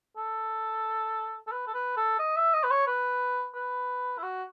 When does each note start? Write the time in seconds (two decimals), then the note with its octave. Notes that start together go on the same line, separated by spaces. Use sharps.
0.17 A4
1.47 A4
1.52 B4
1.67 A4
1.74 B4
1.97 A4
2.19 D#5
2.36 E5
2.53 D#5
2.64 B4
2.71 C#5
2.87 B4
3.54 B4
4.18 E4
4.23 F#4